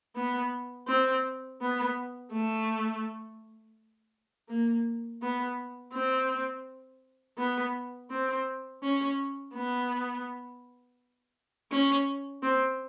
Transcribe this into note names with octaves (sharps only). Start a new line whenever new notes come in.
B3
C4
B3
A3
A#3
B3
C4
B3
C4
C#4
B3
C#4
C4